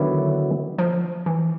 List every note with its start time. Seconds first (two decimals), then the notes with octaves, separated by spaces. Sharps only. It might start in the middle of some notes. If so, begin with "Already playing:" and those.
Already playing: D3 D#3 F#3 B3 E4
0.78 F3
1.26 E3